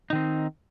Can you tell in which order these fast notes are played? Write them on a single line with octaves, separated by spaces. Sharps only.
D#4 D#3 C4